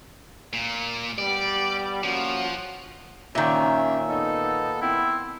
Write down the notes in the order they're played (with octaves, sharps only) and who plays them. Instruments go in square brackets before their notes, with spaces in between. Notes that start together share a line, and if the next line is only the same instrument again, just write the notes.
[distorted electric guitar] A#2
[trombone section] G3 B3 [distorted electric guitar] D5
[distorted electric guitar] F3 [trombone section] A#3 C#4 F#4
[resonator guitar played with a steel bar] A#2 D#3 [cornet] C#4 [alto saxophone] E5
[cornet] B3 [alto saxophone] D#4 [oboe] A4
[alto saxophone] C4 [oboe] E4